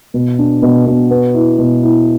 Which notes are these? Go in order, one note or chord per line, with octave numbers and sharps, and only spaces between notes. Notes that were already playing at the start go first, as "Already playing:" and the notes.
B2
D4
B2
B2
B3
E4
B2
E4